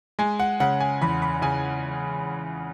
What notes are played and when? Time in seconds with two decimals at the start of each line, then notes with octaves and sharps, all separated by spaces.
0.19 G#3 G#5
0.40 F#5
0.60 C#3 F#5
0.80 G#5
1.02 E2 B5
1.22 B5
1.42 C#3 G#5